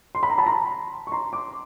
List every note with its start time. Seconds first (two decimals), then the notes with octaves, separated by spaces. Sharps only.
0.15 C6
0.23 B5
0.30 A#5
0.38 A5 B5
0.46 A#5 C6
1.07 C#6
1.12 A#5 C6
1.33 C6 D6